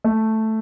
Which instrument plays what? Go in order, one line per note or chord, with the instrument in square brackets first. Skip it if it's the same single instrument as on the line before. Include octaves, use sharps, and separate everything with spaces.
[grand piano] A3